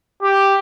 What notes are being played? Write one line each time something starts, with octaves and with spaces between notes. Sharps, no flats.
G4